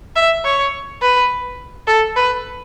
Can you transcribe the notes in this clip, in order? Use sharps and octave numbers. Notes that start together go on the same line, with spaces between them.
E5
C#5
B4
A4
B4